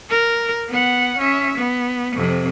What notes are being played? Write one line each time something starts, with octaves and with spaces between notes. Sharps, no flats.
A#4
B3 F#5
C#4 E5
B3
F2 C3